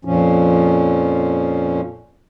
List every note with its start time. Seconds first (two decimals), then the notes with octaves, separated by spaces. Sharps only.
0.05 F2 A#2 F3 C#4